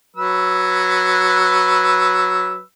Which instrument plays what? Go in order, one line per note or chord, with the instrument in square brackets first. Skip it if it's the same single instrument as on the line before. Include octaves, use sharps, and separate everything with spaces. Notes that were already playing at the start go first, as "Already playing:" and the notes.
[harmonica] F#3 B4 E6